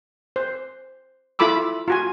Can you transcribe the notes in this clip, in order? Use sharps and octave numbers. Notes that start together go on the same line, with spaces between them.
C5
E4 F4 A4 B5 D6 E6
F4 F#4 G#5